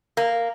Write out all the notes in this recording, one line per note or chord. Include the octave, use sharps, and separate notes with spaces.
A#3